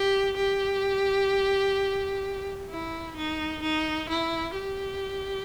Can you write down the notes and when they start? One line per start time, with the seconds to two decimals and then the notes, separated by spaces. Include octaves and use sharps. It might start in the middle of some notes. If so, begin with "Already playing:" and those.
Already playing: G4
0.37 G4
2.70 E4
3.17 D#4
3.63 D#4
4.09 E4
4.55 G4